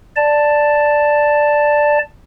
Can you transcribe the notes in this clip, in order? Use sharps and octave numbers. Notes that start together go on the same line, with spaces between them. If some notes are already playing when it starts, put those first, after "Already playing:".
D5 A5